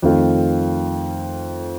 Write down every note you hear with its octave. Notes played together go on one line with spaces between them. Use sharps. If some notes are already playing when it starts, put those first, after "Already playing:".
F2 D#3 A3 C4 F4